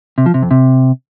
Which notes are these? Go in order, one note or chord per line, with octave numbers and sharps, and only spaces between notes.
C3
F3
C3
F2
C3